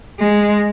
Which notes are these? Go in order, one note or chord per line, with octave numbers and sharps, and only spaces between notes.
G#3